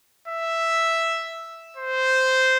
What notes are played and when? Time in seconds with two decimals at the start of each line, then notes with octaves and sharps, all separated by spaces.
0.28 E5
1.77 C5